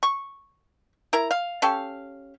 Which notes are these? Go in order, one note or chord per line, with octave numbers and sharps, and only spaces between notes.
C#6
E4 A#4 A#5
F5
C#4 G4 A4 F5